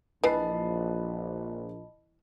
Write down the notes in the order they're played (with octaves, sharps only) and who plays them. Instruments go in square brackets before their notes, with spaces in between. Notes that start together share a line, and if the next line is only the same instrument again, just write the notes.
[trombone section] A#1 [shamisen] E3 [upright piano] B4 C7 [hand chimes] D#5 A5 B5